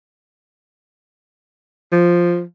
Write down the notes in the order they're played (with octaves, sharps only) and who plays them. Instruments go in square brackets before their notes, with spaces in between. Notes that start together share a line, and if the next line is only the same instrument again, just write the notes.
[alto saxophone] F3